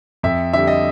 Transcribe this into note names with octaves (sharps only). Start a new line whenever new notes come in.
F2 E5
D3 G3 E5
D#5